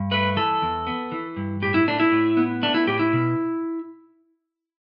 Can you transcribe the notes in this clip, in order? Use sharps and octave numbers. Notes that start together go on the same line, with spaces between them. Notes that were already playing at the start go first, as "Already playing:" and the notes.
Already playing: G2
A3 B4
E3 A4
E2
B3
E3
G2
A2 G4
E4
A3 D4
E4
A2
B3
A3 D4
E4
A2 G4
E4
B2